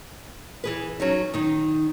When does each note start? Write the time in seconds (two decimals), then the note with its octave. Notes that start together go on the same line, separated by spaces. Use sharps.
0.64 E3 G#4 B4
1.00 F#3 C#4 D#4
1.34 D#3 D#4